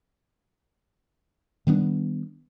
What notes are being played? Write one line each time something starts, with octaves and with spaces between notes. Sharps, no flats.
D#3 G3 B3 D4